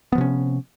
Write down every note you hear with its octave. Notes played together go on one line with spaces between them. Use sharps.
C3 F3 B3 C#4